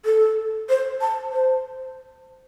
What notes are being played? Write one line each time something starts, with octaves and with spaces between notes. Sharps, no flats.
A4
C5
A5
C5